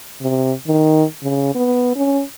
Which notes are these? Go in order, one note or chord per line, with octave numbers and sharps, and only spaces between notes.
C3
D#3
C#3
B3
C#4